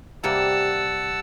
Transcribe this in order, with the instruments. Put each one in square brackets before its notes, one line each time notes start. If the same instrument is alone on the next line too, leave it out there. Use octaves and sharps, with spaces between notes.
[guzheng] C3 G3 A#3 [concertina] F#5 A5 E6